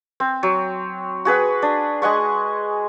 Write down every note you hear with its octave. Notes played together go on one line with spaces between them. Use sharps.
C4
F#3
F#4 G#4 B4 F#5
D4
G#3 D#5 F#5 C#6